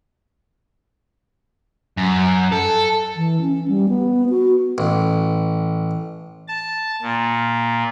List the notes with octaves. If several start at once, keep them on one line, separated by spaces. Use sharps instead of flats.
F#2
A4
E3
C#4
G3
B3
F#4
A1
A5
A#2